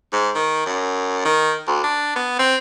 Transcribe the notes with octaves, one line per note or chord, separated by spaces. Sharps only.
G#2
D#3
F#2
D#3
D2
D4
B3
C4